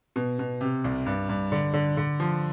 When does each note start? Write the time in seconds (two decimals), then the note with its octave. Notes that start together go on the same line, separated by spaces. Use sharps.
0.16 B2
0.39 B2
0.61 C3
0.84 C2
1.06 G2
1.29 G2
1.52 D3
1.74 D3
1.97 D3
2.20 F3